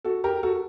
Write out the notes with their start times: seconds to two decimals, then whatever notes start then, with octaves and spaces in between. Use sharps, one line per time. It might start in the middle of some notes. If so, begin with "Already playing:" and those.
0.05 F#4 A4
0.24 G4 A#4
0.43 F#4 A4